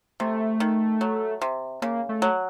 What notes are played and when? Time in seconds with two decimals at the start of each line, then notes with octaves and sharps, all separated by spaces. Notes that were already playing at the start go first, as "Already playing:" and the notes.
0.20 C3 A3
0.60 D#3
1.01 F#3
1.41 C3
1.82 C#3 A#3
2.09 A3
2.22 F#3